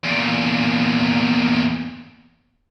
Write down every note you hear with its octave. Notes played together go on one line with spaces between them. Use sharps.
E2 A#2